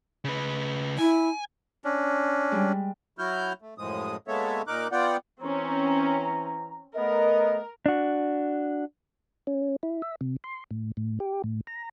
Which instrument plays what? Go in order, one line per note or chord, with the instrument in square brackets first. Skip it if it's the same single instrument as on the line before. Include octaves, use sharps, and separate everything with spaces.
[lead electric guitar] C#3 B4
[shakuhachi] E4 [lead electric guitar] G#5
[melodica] C#4 D4
[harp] G3 G#3
[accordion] F#3 E4 F#4 F6 G6
A3
F#2 A2 F3 G#3 D#6
G#3 A#3 B3 A4 C#5 E5
A#2 D#4 A#4 D6 F#6
B3 F4 D5 F#5 G5
[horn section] E3 A#5 [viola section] C4 C#4
[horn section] A3 B3 [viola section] A#4 [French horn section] D#5
[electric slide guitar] D4 F#4
[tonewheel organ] C#4
E4
E5
C3
C6
A2
A2
G4
A2
A#5